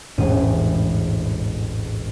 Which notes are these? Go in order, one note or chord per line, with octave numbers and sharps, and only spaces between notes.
E1 A1 G#2 G#3 D#7